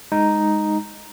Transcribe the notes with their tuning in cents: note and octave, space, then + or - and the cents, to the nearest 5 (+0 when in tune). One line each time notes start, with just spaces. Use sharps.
G#3 +0 D#4 +0